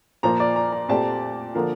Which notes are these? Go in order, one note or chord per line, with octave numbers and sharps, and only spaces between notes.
A#2 F3 A#3 F4 C5 A#5
D5
A#5
A#5
A#2 A3 C4 G4 D5 A5
D3 F3 A#3 F4 A#4